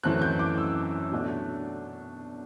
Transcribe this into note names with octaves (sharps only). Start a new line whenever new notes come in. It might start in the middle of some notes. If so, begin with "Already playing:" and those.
F#2 E3 A3 C4 F#6
G6
D6
E6
B2 A3 D4